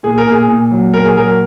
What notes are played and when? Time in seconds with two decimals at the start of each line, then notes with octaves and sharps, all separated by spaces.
0.03 A#2 G#4
0.18 A#4
0.26 A#2
0.31 G#4
0.48 A#2
0.71 F#3
0.93 A#2 A#4
1.05 G#4
1.17 F#3 A#4